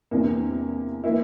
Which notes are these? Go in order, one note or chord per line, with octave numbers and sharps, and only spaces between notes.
E2 C3 E3 A#3 D4
E3 A#3 E4